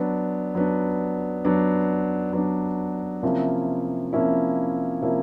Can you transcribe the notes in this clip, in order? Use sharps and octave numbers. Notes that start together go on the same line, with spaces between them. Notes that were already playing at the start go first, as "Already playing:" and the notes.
Already playing: F#3 B3 D4
F#3 B3 D4
F#3 B3 D4
F#3 B3 D4
C3 F3 A#3 C#4 E4
C3 F3 A#3 C#4 E4
C3 F3 A#3 C#4 E4